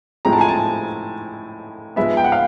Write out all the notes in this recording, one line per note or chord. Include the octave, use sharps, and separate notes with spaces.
A2 F3 G#3 C4 A#5
A5
G#5
A5
F3 G#3 B3 E5
G5
F#5
F5